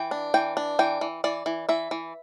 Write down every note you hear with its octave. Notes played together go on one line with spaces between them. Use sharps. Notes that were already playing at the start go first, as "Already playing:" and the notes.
Already playing: E3 G5
D4
E3 G5
D4
E3 G5
E3
E3 D5
E3
E3 E5
E3